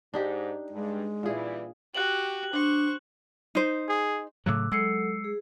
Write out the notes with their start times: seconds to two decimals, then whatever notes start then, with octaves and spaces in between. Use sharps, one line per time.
0.14 G#2 D4 D#4 G4
0.70 G2 G#3
1.23 A#2 E3 G3 E4 G#4
1.95 F#4 G4 F#6 F#7
2.53 D4 C5 C#6
3.55 D#4 C5
3.89 G#4
4.46 A2 C#3 F#3 D6 E6 F#6
4.72 F#3 G#3 A4 E6 C7 C#7
5.24 G#4